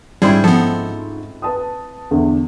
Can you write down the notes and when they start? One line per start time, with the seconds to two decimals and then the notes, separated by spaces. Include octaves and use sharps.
0.22 G#2 G3 C4 C#4 E4 F4 G#4
0.44 F3 B3 A4
1.42 B4 A5 D#6
2.11 E2 D3